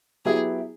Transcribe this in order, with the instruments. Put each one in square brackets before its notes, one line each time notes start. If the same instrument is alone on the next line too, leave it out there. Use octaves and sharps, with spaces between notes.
[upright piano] F#3 B3 E4 G4 [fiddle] G#4